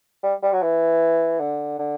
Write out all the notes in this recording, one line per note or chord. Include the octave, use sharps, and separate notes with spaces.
G3
G3
F#3
E3
D3
D3